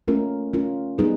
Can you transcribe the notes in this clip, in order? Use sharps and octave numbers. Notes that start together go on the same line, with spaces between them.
A3 C#4 F4 A#4
A3 C#4 F4 A#4
G3 B3 D#4 G#4 B4